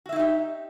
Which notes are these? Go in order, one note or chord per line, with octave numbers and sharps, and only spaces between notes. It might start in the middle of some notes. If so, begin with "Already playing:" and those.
D#4 E4 F#4 G4 E5